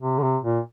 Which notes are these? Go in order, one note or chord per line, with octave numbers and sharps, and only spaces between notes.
C3
D3
C3
A#2